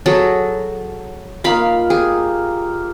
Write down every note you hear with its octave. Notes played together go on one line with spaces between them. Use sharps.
F#3 G#4 A4
A#3 D#4 F4 F5 B5
G4 G#4